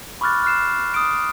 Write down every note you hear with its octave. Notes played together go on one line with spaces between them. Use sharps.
B5 C#6 D6 F6 F#6 A6
F6 F#6 C7 E7
D#6 D7